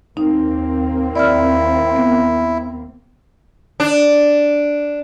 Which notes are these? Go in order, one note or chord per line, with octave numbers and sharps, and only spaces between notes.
D#2 A#3 C4 D#4
E4 D5 F6
B3
D4